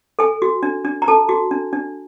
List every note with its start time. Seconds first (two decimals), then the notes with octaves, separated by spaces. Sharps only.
0.19 A4 G#5
0.42 F#4
0.63 D4
0.85 D4
1.02 A#5
1.08 A4 A5
1.29 F#4
1.51 D4
1.73 D4